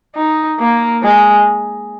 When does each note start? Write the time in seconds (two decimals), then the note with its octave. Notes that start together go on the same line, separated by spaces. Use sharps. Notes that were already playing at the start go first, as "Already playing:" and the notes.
0.16 D#4
0.59 A#3
1.03 G#3